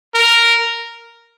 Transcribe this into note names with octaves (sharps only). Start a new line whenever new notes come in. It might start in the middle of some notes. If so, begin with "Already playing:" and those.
A#4